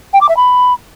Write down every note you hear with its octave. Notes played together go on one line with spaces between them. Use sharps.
G5
D6
E5
B5